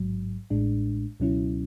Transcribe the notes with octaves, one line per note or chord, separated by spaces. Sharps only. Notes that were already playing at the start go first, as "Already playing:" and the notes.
Already playing: A1 G#2 F#3
A1 A2 G#3 D4
C#2 B2 F#3 C#4 E4